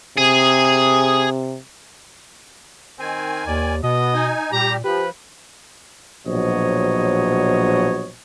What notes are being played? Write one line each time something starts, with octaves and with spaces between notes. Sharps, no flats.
C3 G#4
D#3 C4 G#5
D#2 D5
B2 B3 D#5
D#4 G#5
A#2 G3 G4 A#5
F3 G4 B4
A#1 B2 F#3 C5 C#5 D#5